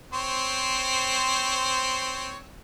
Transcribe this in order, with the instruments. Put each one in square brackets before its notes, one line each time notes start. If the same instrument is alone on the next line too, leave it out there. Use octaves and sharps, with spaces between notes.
[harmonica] C4 C5 C#5